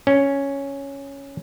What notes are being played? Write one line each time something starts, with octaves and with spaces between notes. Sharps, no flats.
C#4